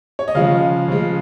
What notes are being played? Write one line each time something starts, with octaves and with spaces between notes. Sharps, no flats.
C#5
D#5
C#3 F3 G#3 F5
C#3 F3 G#3